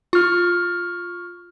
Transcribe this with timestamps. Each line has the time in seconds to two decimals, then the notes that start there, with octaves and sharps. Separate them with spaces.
0.13 F4 C#6 F6